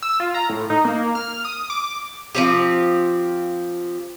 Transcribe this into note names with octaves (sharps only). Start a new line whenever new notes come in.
E6
F4
A#5
A2
D#4
A#3
F6
D#6
D6
D6
F3 C4 G4